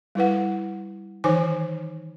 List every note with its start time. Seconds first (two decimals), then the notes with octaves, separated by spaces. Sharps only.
0.15 G3 E4 B4 F#5
1.24 D#3 E3 D#4 C5 G#5 D6